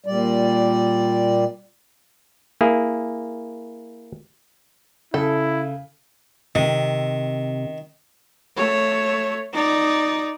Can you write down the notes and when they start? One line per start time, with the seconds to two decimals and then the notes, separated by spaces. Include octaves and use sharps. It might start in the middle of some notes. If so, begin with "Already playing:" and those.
0.06 A#2 G3 D5
2.61 A#3 E4 G#4
5.14 C#3 E4 A4
6.55 C3 D#3
8.57 A3 C#5
9.53 D#4 D5